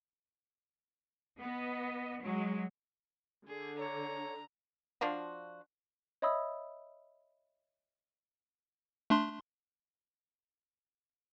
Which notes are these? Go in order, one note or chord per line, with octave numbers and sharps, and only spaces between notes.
B3 D#5
F#3 G#3
D3 G#4
C#5 A#5
F3 D4 F4 F#4
C#5 D#5 E5 B5 D#6 E6
A3 D4 C6